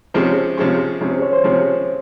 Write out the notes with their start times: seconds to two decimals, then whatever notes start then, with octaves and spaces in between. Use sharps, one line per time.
0.14 C3 F3 G#3 C#4 C5
0.57 C3 F3 G#3 C#4
1.01 C3 F3 G#3 C#4
1.11 C5
1.22 C#5
1.33 C5
1.44 C3 F3 G#3 C#4